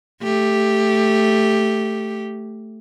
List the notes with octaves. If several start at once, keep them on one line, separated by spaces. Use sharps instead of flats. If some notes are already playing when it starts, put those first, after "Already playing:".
A3 G4